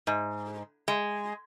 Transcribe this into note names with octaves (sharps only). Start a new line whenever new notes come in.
G#2
G#3